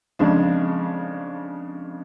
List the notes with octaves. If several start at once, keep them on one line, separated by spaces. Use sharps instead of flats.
F2 C#3 G#3 D4